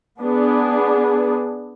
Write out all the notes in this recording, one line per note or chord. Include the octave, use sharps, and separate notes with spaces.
B3 D4 G#4